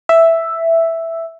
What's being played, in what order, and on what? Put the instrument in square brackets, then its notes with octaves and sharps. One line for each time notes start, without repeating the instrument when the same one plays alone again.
[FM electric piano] E5